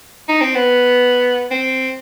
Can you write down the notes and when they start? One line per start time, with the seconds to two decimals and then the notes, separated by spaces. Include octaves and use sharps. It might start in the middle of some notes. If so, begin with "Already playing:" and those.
0.29 D#4
0.41 C4
0.55 B3
1.51 C4